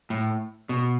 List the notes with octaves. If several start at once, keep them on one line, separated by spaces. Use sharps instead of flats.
A2
B2